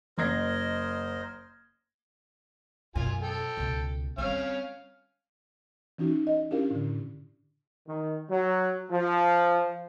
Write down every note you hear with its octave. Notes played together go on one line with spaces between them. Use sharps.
F#1 A#4 C5 D#5 G#6 A#6
F#2 B2 F4 G#5
A4 G5
C#2 B2
G3 C4 C#4 F5 F6
E3 C#4 D#4 F#4
D#5
C#4 D4 E4 G4 A#4 F5
A2 D3
D#3
F#3
F3